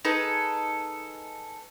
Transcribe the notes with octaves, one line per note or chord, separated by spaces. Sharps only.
D#4 G#4 A4 B4